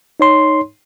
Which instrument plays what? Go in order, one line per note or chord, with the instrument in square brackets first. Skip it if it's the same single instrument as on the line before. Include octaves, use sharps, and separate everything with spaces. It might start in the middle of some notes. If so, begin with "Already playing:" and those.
[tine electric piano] D#4 C#5 C6